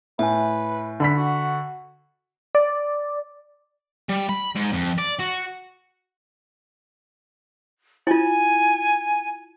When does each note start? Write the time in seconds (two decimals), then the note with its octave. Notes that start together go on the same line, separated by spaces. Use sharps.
0.19 A2 B4 E5 G#5
1.00 D3 B5 B6
1.17 F#4
2.55 D5
4.09 G3
4.29 B5
4.55 G#2
4.72 F2
4.98 D5
5.20 F#4
8.07 E4 F4 G#5